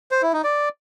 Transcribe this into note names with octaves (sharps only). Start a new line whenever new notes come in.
C5
E4
D#4
D5